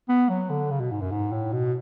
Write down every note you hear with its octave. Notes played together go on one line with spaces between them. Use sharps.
B3
F#3
D3
C#3
B2
G#2
F#2
G#2
A2
B2